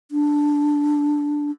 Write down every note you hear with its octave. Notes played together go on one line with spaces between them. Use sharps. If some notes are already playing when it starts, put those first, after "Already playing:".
D4